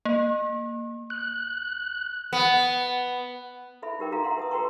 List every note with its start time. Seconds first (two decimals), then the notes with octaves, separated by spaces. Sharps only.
0.05 A#3
1.10 F#6
2.33 B3
3.82 E4 A4 E5 B5
3.99 D#4 G4 A#4 G5 D6
4.12 D4 F#4 A4 F5 A#5
4.24 E5 F#5 A#5 C6
4.37 B4 A5 D#6
4.51 F#4 A4 B4 G5 A#5 C#6